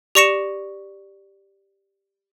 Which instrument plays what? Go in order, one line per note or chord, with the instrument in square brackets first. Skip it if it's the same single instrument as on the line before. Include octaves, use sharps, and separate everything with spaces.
[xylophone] G4 D5 C#6 A#6 C#7 E7